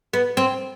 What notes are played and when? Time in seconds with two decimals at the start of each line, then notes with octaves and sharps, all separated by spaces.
0.13 B3
0.37 C4